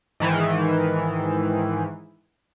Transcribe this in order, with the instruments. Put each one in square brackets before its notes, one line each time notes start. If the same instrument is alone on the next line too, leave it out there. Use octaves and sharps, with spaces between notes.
[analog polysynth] G#2 D#3 E3